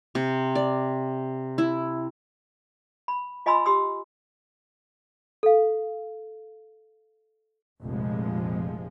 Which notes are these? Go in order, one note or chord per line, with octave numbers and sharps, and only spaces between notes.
C3
D5
E4
B5
F4 D#5 G#5 B5 C6 E6
G4 C6 D#6 E6
A4 F5
F1 A#1 F3 G#3